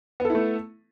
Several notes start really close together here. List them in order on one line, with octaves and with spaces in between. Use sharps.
B3 A4 E4 A3